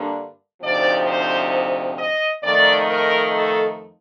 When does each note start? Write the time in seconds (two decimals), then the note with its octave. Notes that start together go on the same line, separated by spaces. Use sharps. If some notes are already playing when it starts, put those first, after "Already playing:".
Already playing: G2 D3 G3 A#3 D4
0.62 D2 C3 F3 C4 D#4 D5
1.06 C5
1.97 D#5
2.42 F2 D#3 A3 D#4 D5
2.88 A#4
3.33 A4